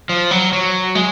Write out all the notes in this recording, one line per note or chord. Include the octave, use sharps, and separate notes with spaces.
F3
F#3
F#3
G#3